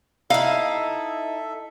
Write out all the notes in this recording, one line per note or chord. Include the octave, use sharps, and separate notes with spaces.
D#4 E4 A4 E5 F5